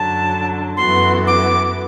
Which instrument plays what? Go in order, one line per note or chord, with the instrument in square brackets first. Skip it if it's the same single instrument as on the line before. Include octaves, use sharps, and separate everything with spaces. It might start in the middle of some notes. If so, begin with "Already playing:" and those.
Already playing: [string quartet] F#2 D3 F#3 [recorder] A5
[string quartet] F#2 E3 B3 F#4 A4 [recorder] C6
[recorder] D6